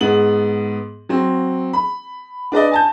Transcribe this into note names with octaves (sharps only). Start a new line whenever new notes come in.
G#2 B3 F#7
F#3 C4
B5
D4 B4 D5 D#5
G#5 A5 G6